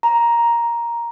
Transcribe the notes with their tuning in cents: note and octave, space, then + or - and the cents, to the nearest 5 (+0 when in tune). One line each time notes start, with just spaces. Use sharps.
A#5 +10